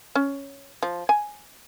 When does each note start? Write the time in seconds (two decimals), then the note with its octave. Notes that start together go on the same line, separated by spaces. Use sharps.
0.15 C#4
0.83 F3
1.09 G#5